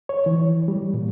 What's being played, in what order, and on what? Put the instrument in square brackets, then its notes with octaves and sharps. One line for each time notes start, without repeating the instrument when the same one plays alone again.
[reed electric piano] C#5
E3
G3
A#2